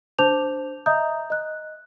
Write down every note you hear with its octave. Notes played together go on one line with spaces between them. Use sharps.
D4 C5 A5 D6 G6 F7
D#5 E5 A#5 D#6 G6
D#5 F#6